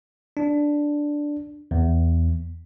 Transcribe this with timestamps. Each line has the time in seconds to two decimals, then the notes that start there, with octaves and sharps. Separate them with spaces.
0.37 D4
1.71 E2